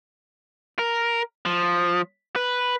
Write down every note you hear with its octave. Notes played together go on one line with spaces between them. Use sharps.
A#4
F3
B4